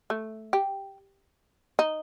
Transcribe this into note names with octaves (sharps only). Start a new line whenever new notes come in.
A3
G4
D#4